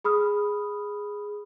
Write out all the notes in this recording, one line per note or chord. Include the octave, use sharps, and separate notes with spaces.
G#4 B5 D#6 F6